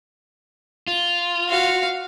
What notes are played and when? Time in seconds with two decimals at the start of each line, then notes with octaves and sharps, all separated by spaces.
0.87 F4
1.49 F#4 F5